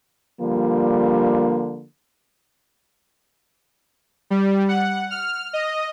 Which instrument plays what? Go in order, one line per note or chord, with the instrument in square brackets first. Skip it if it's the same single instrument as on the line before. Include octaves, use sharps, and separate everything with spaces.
[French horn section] D3 F3 G3 A#3
[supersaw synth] G3
F#5
F6
D#5